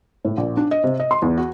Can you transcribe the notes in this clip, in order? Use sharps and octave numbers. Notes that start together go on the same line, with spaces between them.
A2
A#1
D4
D#5
C3
D#5
C6
E2
F#4